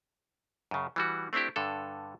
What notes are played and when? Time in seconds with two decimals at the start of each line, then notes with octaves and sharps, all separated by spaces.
0.71 F#2 C#3
0.96 E3 G3 F#4
1.33 A3 C4 D4 E4 G4
1.56 G2 D3 A4